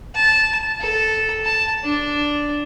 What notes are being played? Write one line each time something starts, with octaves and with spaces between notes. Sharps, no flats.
A5
A4
A5
D4